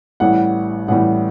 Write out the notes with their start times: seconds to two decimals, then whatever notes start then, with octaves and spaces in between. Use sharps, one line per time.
0.20 A1 A2 E3 G3 F#5
0.88 A1 A2 E3 G3 F#5